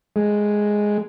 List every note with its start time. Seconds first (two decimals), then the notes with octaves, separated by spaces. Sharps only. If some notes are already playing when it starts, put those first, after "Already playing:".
0.16 G#3